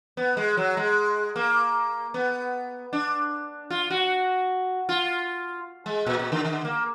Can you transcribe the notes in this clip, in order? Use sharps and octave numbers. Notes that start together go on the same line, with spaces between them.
B3
G#3
F#3
G#3
A#3
B3
D4
F4
F#4
F4
G#3
A#2
A#2
D3
D3
A#3